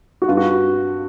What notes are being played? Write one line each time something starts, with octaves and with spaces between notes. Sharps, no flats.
F#4
G2 F4
F#4